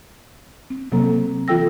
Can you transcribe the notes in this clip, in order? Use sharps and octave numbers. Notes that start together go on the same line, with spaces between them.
C4
C3 F#3 A#3 C4 A4 A#5
E3 F4 A4 G5 E6 A#6